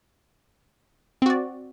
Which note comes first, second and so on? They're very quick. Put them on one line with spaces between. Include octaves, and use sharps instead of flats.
C4 F#4 D5